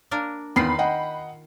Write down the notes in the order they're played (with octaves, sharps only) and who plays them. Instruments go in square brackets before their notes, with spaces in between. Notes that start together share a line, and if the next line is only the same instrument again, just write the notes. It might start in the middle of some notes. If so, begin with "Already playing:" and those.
[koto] A#3 D4 A#4
[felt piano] E2 [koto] D#3 D#4 F4 [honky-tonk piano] B5 C7
[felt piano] D#5 F#5 G5